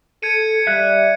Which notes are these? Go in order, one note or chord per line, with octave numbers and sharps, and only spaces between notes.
A4 G#6 C#7 D#7
G3 E5 F#6